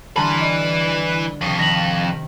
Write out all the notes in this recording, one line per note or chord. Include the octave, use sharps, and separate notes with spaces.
D3 E3 G3 B4 A5 A#5 C6
D5 D#5
F2 C3 D#3 C#6
D#3 A#6 B6 F#7